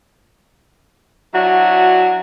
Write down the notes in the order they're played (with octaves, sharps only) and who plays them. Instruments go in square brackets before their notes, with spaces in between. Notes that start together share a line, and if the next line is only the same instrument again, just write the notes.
[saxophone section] F#3 D4 E4 F#4